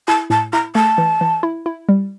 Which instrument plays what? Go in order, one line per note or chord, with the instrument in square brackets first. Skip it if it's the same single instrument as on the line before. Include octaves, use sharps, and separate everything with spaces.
[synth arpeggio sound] E4 [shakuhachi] A5
[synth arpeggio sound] A2 [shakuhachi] A5
[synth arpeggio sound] E4 [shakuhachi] A#5
[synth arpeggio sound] A3 [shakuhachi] A5
[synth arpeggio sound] E3
E3
E4
E4
G3